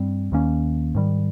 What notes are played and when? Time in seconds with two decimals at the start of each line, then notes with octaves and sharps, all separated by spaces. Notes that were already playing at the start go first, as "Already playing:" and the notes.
Already playing: G2 G3 C4
0.32 D#2 D#3 A#3 C#4
0.95 G#2 D#3 G3